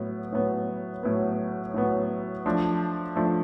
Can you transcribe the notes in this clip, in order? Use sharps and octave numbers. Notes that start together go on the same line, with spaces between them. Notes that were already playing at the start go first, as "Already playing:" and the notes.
Already playing: A2 F#3 B3
A2 F#3 B3
A2 F#3 B3
A2 F#3 B3
F3 A3 D4
F3 A3 D4